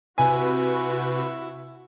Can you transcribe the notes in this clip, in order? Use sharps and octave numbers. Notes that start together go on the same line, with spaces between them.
C3 E4 F#4 B4 G#5